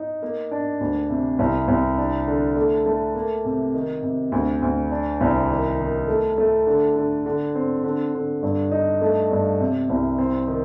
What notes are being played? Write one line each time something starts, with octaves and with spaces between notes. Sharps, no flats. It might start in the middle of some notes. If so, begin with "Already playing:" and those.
Already playing: D#4
A#3
D4
D2
C3
C2
C2
D4
D3
A3
A3
A#3
C3
D#3
C3
D2
D2
D4
C2
D#3
D#3
A3
A3
D3
D3
D3
C4
D3
D3
G2
D#4
A3
G2
C3
C2
C4
D#3